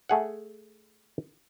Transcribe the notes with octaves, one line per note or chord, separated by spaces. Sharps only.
A3 G#4 F#5